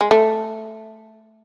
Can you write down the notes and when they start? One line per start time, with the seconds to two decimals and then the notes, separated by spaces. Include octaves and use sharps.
0.01 G#3
0.11 A3